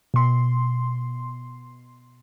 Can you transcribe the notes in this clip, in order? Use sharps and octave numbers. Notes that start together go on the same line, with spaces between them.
B2 C6